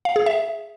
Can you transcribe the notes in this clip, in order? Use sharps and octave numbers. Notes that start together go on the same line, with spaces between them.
F5
G#4
E5